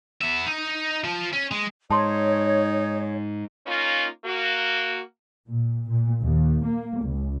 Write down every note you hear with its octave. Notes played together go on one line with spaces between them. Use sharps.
B3 E5
D#4
F3 F4
C#4
G#3
G#2 D#4 C#5 A5 C6
A#3 C#4 D#4 F4
A#3 F#4
A#2
A#2
D#2
A#3
C#2